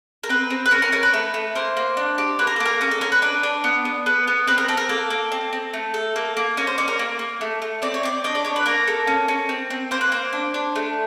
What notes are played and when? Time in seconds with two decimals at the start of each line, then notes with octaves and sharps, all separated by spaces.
0.23 A#4
0.29 C4 B4
0.50 C4
0.66 B4
0.71 C#4 A#4
0.82 A#4
0.92 C#4 A#4
1.03 B4
1.14 A3
1.34 A3
1.55 A#3 C5
1.77 A#3
1.97 D4
2.18 G4
2.39 A#3 B4
2.47 A#4
2.56 A4
2.60 A#3
2.65 A#4
2.81 C#4 A#4
2.91 A4
3.01 C#4 A#4
3.12 B4
3.22 D4 B4
3.43 D4
3.64 B3
3.85 B3
4.06 B3 B4
4.28 B3
4.47 C4 B4
4.58 A#4
4.68 C4 A4
4.77 A#4
4.89 A#3 A4
5.10 A#3
5.32 C4
5.53 C4
5.74 A3
5.94 A4
6.16 A#3
6.37 A#3
6.57 C#4 A#4
6.67 C5
6.78 C#4 D5
6.88 A#4
6.99 A#3
7.19 A#3
7.41 A3
7.62 A3
7.82 C4 D5
7.94 C#5
8.03 C4 D5
8.24 D4 D#5
8.35 D5
8.45 D4 C#5
8.56 B4
8.66 A#3 A#4
8.87 A4
9.07 C#4
9.28 C#4
9.49 C4
9.70 C4
9.91 A#3 C5
10.01 B4
10.12 A#3 C5
10.33 D4
10.54 D4
10.76 A3